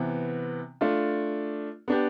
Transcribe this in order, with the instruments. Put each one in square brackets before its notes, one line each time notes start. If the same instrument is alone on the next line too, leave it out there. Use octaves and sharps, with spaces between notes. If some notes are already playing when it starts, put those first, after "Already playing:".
Already playing: [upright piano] C3 E3 B3
A3 D4 F4
B3 D4 G4